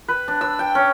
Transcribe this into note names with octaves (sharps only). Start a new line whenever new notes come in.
B4
D4
E6
G5
C#4